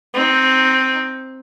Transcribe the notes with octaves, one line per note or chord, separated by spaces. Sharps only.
C4 D#4